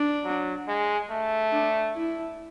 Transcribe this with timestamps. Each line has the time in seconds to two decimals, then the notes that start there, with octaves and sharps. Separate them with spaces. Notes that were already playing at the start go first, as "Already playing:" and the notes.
Already playing: D4
0.24 F#3
0.68 G#3
1.10 A3
1.52 D4
1.96 E4